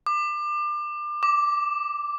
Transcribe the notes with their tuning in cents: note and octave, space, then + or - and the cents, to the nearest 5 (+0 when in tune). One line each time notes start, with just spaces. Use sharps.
D6 +30
D6 +0